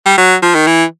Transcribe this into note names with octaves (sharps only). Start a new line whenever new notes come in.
G3
F#3
F3
D#3
E3